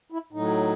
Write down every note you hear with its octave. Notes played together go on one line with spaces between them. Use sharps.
E4
A2 F#3 D#4